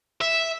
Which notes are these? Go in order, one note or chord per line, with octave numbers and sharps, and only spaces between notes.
E5